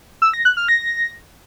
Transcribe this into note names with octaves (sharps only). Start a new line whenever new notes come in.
E6
A#6
F#6
F6
A#6